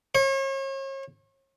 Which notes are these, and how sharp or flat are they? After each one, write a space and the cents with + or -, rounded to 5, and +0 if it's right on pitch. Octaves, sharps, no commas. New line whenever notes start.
C#5 -40